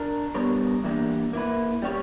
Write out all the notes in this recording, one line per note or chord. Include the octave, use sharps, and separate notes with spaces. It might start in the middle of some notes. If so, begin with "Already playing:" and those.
Already playing: D4 A#4
G3 B3 D4 A#4 C#5
E3 G3 A#3 D4
A#3 E4 B4
G3 C#4 G4 C#5